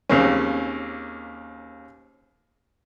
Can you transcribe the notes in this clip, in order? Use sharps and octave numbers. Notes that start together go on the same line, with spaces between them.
D#2 C#3 A#3 C4 C#4